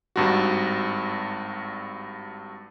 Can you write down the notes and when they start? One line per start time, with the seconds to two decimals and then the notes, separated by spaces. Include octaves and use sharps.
0.16 G#1 G2 F#4